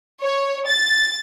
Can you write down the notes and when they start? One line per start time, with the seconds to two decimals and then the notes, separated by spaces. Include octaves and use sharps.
0.22 C#5
0.67 A6